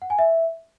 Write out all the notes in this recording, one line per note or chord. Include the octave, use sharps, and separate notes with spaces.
F#5
G#5
E5